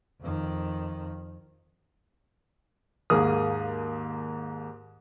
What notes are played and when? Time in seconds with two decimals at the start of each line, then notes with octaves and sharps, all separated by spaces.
0.21 F2 D#3
3.10 D#2 G#2 A#3 G#4 D#6